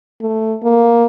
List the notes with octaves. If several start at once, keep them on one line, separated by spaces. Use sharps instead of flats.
A3
A#3